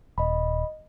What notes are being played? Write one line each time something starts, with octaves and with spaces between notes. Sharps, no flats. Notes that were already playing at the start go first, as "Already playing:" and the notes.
D#1 D#5 B5